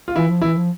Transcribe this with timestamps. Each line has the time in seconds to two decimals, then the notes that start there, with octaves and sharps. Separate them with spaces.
0.08 F4
0.16 E3 E4
0.29 F3
0.42 E3 E4
0.57 F3